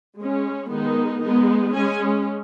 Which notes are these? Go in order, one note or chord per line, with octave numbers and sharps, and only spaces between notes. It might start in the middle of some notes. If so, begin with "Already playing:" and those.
G#3 C#4
D#3 G#3 B3 D#4
G#3 B3 D#4
G#3 C#4 G#5